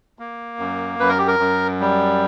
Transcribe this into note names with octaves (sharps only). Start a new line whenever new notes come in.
A#3
F#2
F#2 B4
A#4
G4
A#4
F#2
G3